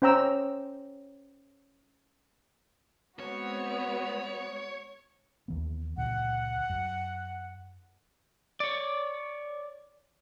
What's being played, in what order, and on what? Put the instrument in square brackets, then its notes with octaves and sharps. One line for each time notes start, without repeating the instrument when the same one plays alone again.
[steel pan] C#4 C5 G5 A#5 E6
[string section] G#3 C4 F#4 [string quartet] B3 [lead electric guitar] C#5
[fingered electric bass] D#2 E3 B3
[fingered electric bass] C#2 A#2 D3 [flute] F#5
[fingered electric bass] F#2
[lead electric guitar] C#5 D5